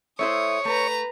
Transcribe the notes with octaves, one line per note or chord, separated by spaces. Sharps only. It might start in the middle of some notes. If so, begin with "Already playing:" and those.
A3 E4 C5 C#5 D#6
A3 B4 A#5